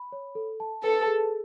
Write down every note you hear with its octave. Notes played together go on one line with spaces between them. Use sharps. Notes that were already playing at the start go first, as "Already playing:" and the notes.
Already playing: B5
C#5
A4
A5
A4 B4
G#4